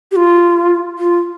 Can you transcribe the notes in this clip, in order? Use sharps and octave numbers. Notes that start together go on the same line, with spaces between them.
G4
F4
F4